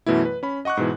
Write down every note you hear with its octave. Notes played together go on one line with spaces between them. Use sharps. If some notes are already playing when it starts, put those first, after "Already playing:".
F#2 B2 E3 A3 E4
B4
C#4 B5
D#5 F#5 C#6 D6 F#6
G#2 B2 E3